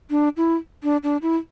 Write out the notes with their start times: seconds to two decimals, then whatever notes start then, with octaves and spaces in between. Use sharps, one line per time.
0.10 D4
0.37 E4
0.83 D4
1.03 D4
1.22 E4